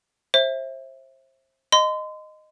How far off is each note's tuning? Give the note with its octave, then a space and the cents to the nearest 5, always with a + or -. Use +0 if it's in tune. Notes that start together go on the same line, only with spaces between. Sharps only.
C5 +30 E5 +0
D#5 -10 C6 -35